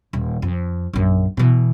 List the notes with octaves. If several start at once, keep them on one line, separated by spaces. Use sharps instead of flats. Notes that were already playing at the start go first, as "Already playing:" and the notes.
D#1
F2
A#1 F#2
B2 E3